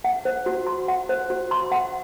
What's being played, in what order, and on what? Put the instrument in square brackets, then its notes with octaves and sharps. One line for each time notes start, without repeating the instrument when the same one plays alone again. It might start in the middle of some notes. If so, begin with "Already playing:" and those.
[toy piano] F#5
C5
F#4
C6
F#5
C5
F#4
C6
F#5